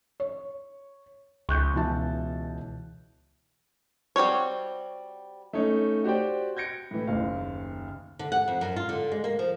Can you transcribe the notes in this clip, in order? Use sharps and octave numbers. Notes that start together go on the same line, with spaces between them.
C#5
C#2 C#6 F#6 G6
B2 E3 A5
G3 C4 F#4 C#5
A3 C#4 D#4 C#5
F#4 G4 C5 D5 G5
G6 G#6 A#6 C#7 D7
A2 E3
F#1 D#2 F5
D3
F#5
F2
F#2
F4
D3
G#3
A#3
F3